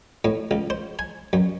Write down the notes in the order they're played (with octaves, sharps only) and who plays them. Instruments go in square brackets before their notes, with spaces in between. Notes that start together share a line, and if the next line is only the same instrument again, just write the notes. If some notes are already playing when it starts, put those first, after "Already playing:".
[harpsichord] A2
C#2
C5
G#5
F#2